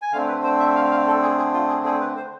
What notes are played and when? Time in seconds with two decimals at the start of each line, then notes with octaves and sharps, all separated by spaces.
0.02 G#5
0.12 D3 A3 C4 F5
0.28 B4
0.44 C5
0.60 E5
0.76 F5
0.91 F5
1.07 A4
1.22 G#4
1.38 G#4
1.53 F4
1.69 G#4
1.85 G#4
2.00 B4
2.16 C5